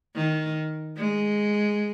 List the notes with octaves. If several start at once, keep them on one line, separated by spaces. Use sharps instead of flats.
D#3
G#3